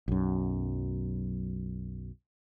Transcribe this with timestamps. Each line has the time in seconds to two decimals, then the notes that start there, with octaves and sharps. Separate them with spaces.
0.08 B1 F#2